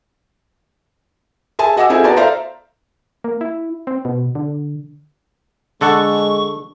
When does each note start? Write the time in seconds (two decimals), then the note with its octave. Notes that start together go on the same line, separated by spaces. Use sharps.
1.59 G#4 E5 G#5 A5
1.76 F#4 D#5 F#5 G#5 D6 E6
1.90 C4 E4 F4 G#4 A4
2.04 B3 F#4 D5 A5 A#5
2.16 A4 C5 D5 E5 F5 A#5
3.24 A#3
3.41 E4
3.87 C4
4.05 B2
4.35 D3
5.81 D3 G#3 A4 F#5 C#6